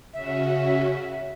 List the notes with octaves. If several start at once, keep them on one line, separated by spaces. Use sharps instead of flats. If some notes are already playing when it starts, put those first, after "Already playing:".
C#3 C#4 F#4 E5